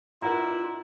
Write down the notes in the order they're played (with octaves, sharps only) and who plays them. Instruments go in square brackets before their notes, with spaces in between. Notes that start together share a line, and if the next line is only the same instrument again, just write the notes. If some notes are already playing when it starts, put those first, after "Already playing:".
[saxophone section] B2 D4 E4 [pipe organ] F4 [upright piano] A#4 F#5 A#5